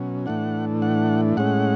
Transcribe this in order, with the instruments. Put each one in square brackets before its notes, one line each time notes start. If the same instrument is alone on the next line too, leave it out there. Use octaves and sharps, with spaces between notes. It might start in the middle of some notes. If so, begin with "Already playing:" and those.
Already playing: [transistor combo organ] B2 F#3 C#4
A2 E3 A3 D4 F#5
F#5
A2 G#3 C#4 F#5